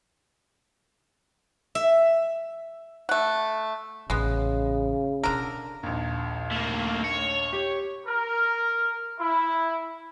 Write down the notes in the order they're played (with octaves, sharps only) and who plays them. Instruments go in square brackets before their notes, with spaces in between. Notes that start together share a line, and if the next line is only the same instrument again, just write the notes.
[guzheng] E5
[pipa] A3 F#5
[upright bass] A1 A3 [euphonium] C#3 [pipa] G#3 B3
[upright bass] B2 E4 [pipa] D3 A#4
[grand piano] A#1 D#2
[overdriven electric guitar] A3 A#3
C#5
[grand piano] G4
[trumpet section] A#4
E4